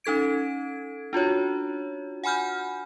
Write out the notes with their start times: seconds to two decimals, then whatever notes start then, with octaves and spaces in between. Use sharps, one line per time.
0.04 C#4 D#4 A4 G#6 D7
1.13 D4 F4 F#4 C#5
2.24 F#5 G#5 B5 F6 G6